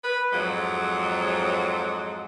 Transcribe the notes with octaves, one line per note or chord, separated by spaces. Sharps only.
B4
F2 G#2 F#3 G#3